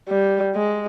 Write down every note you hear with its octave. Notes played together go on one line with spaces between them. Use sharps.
G3
G#3